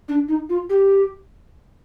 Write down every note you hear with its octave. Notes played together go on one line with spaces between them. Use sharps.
D4
D#4
F4
G4